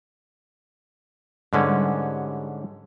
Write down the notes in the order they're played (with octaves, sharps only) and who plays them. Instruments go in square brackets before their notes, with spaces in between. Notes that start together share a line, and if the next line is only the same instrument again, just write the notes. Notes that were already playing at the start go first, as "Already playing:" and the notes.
[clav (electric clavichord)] G#2 D3 C#4 [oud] G3 B4 C#5